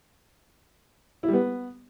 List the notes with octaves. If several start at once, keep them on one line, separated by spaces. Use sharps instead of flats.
E4
G3
B3